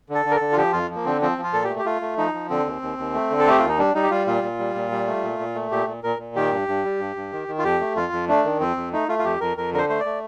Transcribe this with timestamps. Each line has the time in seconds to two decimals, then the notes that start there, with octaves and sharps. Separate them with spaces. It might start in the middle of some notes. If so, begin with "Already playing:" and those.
0.09 D3
0.14 A4
0.25 D3
0.31 A#4
0.36 D3 A4
0.52 F4
0.57 F3 G4
0.73 F2 F4
0.90 F3
0.95 A#3
1.05 D3 C4
1.22 F3 C4
1.38 F3
1.43 F4
1.53 A#2 A4
1.64 G4
1.70 A3
1.79 G4
1.85 A3 F4
2.02 A3
2.18 F3 D#4
2.34 F3
2.50 D3 C4
2.66 D#2
2.82 D#2
2.98 D#2
3.14 A3
3.30 D3
3.39 A4
3.47 A3 G4
3.59 D#2 F4
3.69 D#4
3.78 G3 D4
3.95 G3 D#4
4.03 G4
4.10 G3 F4
4.27 A#2 F4
4.43 A#2
4.59 G3
4.75 A#2
4.91 G3
5.07 A3
5.23 A#2
5.39 A#2
5.55 A3
5.71 A#2 G4
5.87 A#2
6.03 A#2 A#4
6.19 A#2
6.36 D#3 G4
6.52 G2
6.68 G2
6.84 G3
7.00 G2
7.16 G2
7.32 D#3
7.48 D#3
7.59 F4
7.64 F2 G4
7.80 A3
7.96 F2 F4
8.12 F2
8.28 A3 D4
8.44 D#3
8.60 F2 C4
8.76 F2
8.93 A3 D#4
9.09 A3 F4
9.19 F4
9.25 F2 G4
9.41 F2 A#4
9.57 F2 A#4
9.73 D3 A#4
9.78 C5
9.89 A3 C5
10.00 D5
10.05 A3